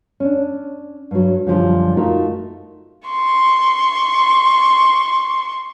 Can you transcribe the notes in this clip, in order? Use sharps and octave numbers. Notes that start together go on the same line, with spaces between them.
C#4 D4
G2 F#3
F#2 A#2 D3 F3 G3
A3 D#4 F4 F#4 A#4
C6 C#6